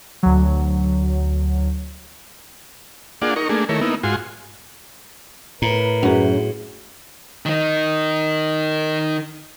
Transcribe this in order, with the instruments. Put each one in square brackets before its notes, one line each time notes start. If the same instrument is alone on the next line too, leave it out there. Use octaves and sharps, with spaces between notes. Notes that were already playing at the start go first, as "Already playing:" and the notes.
[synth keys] D2 F#3
[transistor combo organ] A#3 D4 F4 G#4 D5 F#5
D#4 A#4 C#6
A3 A#3 D4 G#4
D#3 A3 E4 A#4 C#5
A#3 B3 D#4 E4
G#2 F4 F#4 G#5 C6
[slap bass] A2 [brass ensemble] A#4 B4 [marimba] A#5
[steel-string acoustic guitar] F#2 [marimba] F#4 G#4
[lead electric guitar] D#3 D#4